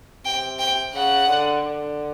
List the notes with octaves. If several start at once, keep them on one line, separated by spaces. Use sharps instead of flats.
C3 G5
G5
C#3 F#5
D3
D3